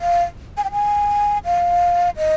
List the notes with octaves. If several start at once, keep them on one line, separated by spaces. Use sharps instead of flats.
F5
G#5
G5
G#5
F5
D#5